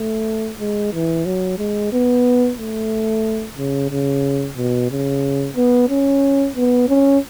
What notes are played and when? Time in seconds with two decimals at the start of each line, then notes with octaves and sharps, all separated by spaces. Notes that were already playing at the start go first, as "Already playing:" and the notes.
Already playing: A3
0.59 G#3
0.93 E3
1.26 F#3
1.59 G#3
1.93 B3
2.59 A3
3.57 C#3
3.91 C#3
4.57 B2
4.91 C#3
5.56 B3
5.89 C#4
6.56 B3
6.89 C#4